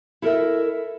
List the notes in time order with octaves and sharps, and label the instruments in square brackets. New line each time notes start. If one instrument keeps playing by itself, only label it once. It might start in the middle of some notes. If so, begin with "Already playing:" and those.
[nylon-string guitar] E4 A4 A#4 C#5 D#5 E5